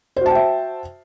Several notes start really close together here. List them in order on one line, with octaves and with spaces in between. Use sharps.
C5 F#4 A5 G5 E5